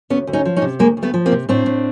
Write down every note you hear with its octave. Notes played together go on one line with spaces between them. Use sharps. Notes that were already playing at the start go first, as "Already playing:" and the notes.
D2 B3 C#4
D2
C#4 D#4
F3
C#4 D#4
C3
D2 G#3 A#3
D2
A3 B3
F3
A#3 C4
C3
A2 C4 D4
A2